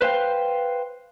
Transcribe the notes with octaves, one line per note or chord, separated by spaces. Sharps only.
B4 C5 F5 G5